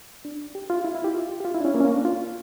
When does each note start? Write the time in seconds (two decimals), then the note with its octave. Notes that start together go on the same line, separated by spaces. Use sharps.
0.25 D4
0.55 G4
0.70 F4
0.84 E4
0.95 E4
1.04 G4
1.15 F4
1.40 G4
1.45 F4
1.54 E4
1.60 D4
1.65 C#4
1.74 A#3
1.80 C#4
1.85 A#3
1.94 D4
2.05 F4